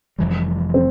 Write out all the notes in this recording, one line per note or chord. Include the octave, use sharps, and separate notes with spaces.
F1 F2 E3 G3
C4